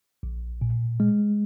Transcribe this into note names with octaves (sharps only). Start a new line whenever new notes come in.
A#1
A#2
G#3